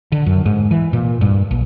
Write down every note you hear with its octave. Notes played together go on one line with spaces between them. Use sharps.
D3
F#2
G#2
E3
A#2
G2
A#1